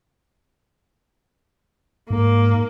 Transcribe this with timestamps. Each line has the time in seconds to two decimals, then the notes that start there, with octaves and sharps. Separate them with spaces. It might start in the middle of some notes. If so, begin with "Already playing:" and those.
2.10 G#2 A#3